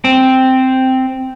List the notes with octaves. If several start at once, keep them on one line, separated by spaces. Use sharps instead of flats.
C4